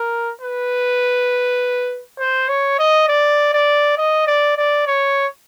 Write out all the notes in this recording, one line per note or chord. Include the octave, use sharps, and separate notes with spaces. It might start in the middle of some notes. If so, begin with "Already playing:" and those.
Already playing: A#4
B4
C5
C#5
D#5
D5
D5
D#5
D5
D5
C#5